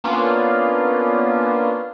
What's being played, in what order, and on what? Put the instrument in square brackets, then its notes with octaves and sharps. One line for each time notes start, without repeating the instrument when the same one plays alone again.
[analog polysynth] A#3 B3 C#4 D4 F4